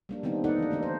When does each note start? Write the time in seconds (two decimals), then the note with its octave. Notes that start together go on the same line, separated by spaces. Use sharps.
0.09 G3 A#3 D4
0.23 D#3 G3 B3 C4 D4 D#4
0.44 A#3 B3 D#4 A4 D5 F#5
0.59 E3 D4
0.70 D3 A3 D4 D#5
0.83 C5